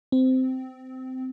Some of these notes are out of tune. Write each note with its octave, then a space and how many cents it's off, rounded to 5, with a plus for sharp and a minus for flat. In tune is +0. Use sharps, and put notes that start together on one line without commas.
C4 -15